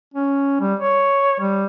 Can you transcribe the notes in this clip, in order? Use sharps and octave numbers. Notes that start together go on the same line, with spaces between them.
C#4
G3
C#5
G3